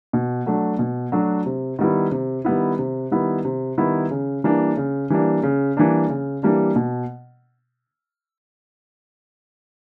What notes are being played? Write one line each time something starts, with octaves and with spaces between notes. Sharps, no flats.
B2
F#3 A3 D4 F#4
B2
F#3 A3 D4 F#4
C3
D#3 G3 B3 E4
C3
D#3 G3 B3 E4
C3
D#3 G3 B3 E4
C3
D#3 G3 B3 E4
C#3
E3 G3 A#3 D4
C#3
E3 G3 A#3 D4
C#3
E3 G3 A#3 D4
C#3
E3 G3 A#3 D4
B2